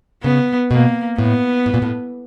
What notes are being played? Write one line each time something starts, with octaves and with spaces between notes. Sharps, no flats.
C#3 B3
B2 A#3
A2 B3
A2
A#2
A2